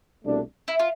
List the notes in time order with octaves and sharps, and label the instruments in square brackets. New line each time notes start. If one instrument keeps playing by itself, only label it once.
[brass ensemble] C2 B2 A3 D4
[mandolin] E4
F4